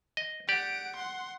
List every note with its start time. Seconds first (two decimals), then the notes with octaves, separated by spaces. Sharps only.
0.17 D#5
0.49 G4 D5 F#5 D7
0.96 F#5 C6